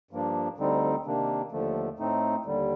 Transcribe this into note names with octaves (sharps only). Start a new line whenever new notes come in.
G2 F3 A#3 D4
D2 D3 G3 C4 D#4
C3 D#3 A#3 D4
D#2 D3 F3 A3
A2 A3 C4 D#4
D#2 D3 G3